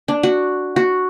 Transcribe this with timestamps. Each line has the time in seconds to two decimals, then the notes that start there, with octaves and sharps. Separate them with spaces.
0.08 D4
0.23 F#4
0.76 F#4